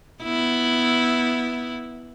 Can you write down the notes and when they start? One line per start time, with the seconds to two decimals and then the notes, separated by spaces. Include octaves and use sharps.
0.23 B3 E4